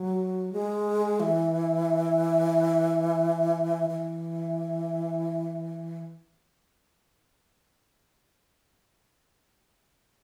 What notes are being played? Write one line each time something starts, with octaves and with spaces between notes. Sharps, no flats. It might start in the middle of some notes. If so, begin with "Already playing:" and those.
Already playing: F#3
G#3
E3
E3